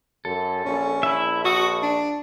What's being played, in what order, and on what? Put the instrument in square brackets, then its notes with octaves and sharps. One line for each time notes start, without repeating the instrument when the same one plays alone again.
[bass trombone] F#2 [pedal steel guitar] A4
[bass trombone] A#1 [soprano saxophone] C#4
[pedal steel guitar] E4 E5
[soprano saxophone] F#4 [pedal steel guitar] C#6 D#6
[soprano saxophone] D4